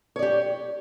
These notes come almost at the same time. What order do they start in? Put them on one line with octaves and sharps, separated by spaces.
C#5 D5 G4